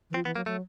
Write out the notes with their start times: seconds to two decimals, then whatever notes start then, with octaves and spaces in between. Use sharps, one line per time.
0.10 E3
0.14 F3 C4
0.25 E3 B3
0.36 F#3 A#3
0.46 F#3 A3